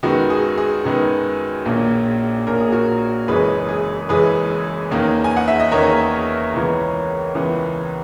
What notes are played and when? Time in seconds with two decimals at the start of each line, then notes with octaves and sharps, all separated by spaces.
0.03 F#2 D#3 G#3 B3 F#4
0.30 G#4
0.58 G#4
0.85 F#2 D#3 G#3 B3
1.65 A#1 A#2 A#3 C#4
2.47 A#1 A#2 A#3 C#4 A#4
2.60 G#4
2.72 F#4 A#4
3.28 F#1 F#2 E3 G#3 C#4 G#4 B4
3.69 G#4
4.09 F#1 F#2 E3 G#3 C#4 G#4 B4
4.91 E2 D#3 A#3 C#4
5.24 G#5
5.37 F#5
5.48 E5
5.60 D#5
5.72 E2 D#3 A#3 C#4 A#4 C#5
6.54 C#2 C#3 E3 B3
7.34 C#2 C#3 E3 B3